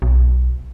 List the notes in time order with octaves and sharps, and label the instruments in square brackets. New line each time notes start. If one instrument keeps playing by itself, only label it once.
[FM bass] B1